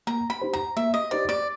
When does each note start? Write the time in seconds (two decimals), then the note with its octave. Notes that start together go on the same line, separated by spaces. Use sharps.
0.07 A#3 A#5
0.30 B5
0.42 D#4 G4 C5
0.53 A#5
0.77 A#3 E5
0.94 D#5
1.11 D#4 G4 C5 D5
1.29 D5